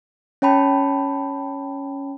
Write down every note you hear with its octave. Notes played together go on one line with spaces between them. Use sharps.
C#4 C#5 G5 A5 B5